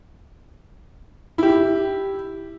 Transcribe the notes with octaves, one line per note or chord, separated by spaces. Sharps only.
E4 G4